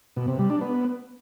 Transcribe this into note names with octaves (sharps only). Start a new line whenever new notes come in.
B2
C3
G3
D4
B3